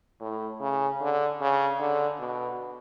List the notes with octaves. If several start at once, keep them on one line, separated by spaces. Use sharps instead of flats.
A2
C#3
D3
C#3
D3
B2